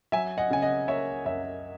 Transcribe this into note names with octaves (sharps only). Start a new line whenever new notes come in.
F#3 E5 G#5
D#5 F#5
C#3 G#5
D#5 F#5
A#3 C#5 E5
F#2 C#5 E5